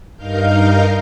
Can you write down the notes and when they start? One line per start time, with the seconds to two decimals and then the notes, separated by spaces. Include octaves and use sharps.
0.16 G2 D#4 A#4 F5 F6 G6